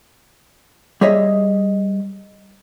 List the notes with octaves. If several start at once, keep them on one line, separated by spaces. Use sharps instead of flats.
G3 G#4 C#5 D#5 E5